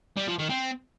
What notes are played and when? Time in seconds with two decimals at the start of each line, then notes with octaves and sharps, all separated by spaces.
0.17 G3
0.28 F3
0.39 D#3
0.49 C4